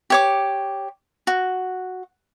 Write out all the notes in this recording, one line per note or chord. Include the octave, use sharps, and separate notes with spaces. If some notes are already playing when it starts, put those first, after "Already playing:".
G4 C#5 D6
F#4